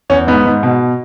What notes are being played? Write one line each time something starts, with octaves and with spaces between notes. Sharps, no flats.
E2 C#4
G#2 B3
G#2
B2